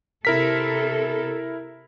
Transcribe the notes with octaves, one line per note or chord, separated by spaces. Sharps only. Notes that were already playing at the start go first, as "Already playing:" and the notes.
C3 E4 A4 A#4 B6